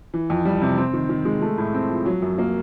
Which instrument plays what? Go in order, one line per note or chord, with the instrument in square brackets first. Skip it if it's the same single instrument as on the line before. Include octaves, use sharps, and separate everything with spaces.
[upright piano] E3
F2
G3
C3
C4
D#3
D#3
G#3
A3
A2
C4
F3
F#3
F#2
A#3